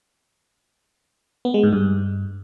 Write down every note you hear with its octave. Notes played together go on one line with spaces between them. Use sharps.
B3
G#3
G#2
G2